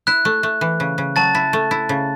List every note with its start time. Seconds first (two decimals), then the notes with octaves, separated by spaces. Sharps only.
0.07 E4 F#6
0.25 A3
0.43 A3
0.61 E3
0.80 C#3
0.98 C#3
1.16 F#3 A5 A6
1.35 E4
1.53 A3
1.71 E4
1.89 C#3